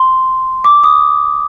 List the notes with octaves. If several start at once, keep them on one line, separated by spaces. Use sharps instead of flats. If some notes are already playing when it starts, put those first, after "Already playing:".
Already playing: C6
D6
D#6